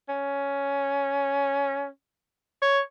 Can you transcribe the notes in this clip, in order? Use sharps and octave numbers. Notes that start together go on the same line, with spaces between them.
C#4
C#5